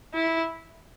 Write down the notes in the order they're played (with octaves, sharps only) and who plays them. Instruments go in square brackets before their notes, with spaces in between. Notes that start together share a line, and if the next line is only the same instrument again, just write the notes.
[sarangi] E4